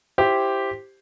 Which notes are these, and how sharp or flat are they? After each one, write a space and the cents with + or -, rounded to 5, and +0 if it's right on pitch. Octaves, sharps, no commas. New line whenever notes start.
E4 +10 G4 +0 C5 +0